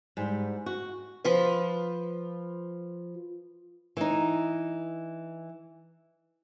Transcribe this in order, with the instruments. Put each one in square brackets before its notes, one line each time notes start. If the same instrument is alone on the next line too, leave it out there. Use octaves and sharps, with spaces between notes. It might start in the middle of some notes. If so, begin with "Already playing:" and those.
[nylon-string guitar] G#2 G3
F#4
[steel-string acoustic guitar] F3 F4 B4
[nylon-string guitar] E3 D#4